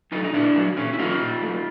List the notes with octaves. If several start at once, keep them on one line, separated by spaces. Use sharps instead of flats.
F#3 A3 D#4 F4
D#4
A#2 D4 E4
F#3 A3
A#2 C#4
E4
F#3 A3 D#4 F4
A#2
F#3 A3